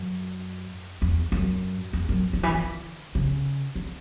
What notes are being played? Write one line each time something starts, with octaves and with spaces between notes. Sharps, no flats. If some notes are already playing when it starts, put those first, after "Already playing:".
Already playing: F#2
E2
F#2
E2
F#2
D3
E3
D3
C#3
D3